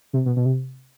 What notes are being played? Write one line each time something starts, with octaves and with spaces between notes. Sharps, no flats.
C3
B2
B2
C3